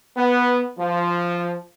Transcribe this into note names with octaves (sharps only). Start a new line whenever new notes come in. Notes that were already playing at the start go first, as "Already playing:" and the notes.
B3
F3